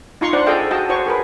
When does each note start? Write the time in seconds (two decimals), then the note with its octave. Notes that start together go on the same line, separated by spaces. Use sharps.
0.21 D#4 F4 A#5 C6 C#6
0.33 D4 C5 D5 F#5
0.46 G#4 A4 D#5 F5 G5
0.71 F#4 D#5 G5 A5
0.89 F#4 C5 C#5 C#6
1.07 G#4 A#4 B4